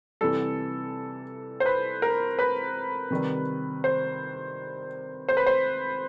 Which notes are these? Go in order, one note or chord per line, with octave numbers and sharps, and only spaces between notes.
C3 E3 G3 A4
C5
B4
A#4
B4
C3 D#3 G3
C5
C5
B4
C5